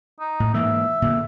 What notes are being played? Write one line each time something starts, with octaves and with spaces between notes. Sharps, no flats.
D#4
A2
G#2 E3 A#3 E5
A#2 D3